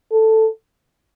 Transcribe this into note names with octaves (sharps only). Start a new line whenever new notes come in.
A4